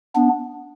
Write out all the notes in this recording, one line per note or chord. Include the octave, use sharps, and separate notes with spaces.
B3 D4